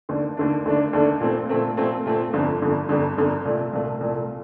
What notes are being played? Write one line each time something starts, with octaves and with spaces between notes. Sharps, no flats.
D#2 D3 A3 D4
D#2 D3 A3 D4
D#2 D3 A3 D4
D#2 D3 A3 D4
A#2 A3 C4
A#2 A3 C4
A#2 A3 C4
A#2 A3 C4
G1 F2 D3
G1 F2 D3
G1 F2 D3
G1 F2 D3
C2 A#2 A3
C2 A#2 A3
C2 A#2 A3